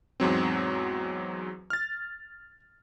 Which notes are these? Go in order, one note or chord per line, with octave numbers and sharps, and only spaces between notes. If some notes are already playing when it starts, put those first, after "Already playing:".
E2 G#2 F#3 C4
F6 A6